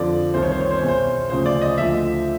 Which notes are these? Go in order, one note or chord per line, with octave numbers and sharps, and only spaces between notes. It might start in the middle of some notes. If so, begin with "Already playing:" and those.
Already playing: F2 D3 F3 D5
C2 C3 D#3 C5
C#5
C5
C#5
C5
E2 B2 C#5
C5
D2 C#3 F3 C5
D5
D#5
D2 D3 F3 E5